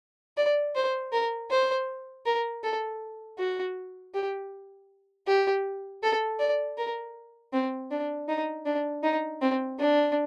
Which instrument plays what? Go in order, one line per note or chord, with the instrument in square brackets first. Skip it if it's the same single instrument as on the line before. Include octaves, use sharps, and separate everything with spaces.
[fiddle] D5
C5
A#4
C5
A#4
A4
F#4
G4
G4
A4
D5
A#4
C4
D4
D#4
D4
D#4
C4
D4